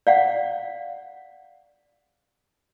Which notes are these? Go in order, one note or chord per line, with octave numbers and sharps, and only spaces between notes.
D5 F5 F#5